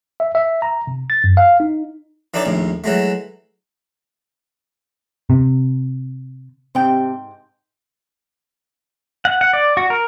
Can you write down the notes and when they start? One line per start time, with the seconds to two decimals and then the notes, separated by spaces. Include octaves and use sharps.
0.20 E5
0.35 E5
0.62 A#5
0.87 C3
1.10 A6
1.24 F#2
1.37 F5
1.60 D#4
2.34 E3 D4 D#4 A4 C#5 D5
2.45 A#1 D#2 A2
2.84 E3 F#3 G#3 A3
5.30 C3
6.75 G#2 C3 G5
9.25 F#5
9.41 F#5
9.53 D5
9.77 F#4
9.90 A#4